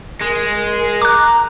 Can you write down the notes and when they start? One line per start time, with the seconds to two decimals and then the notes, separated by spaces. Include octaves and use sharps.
0.21 G#3 A#4
1.02 A#5 D6 F#6